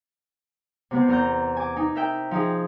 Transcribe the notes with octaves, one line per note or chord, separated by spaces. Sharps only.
C3 B3 C4
E2 A#4 A#5 G6
G#5 D6
D#4 G#5
A#4 E5 G5
F3 D#4 G#4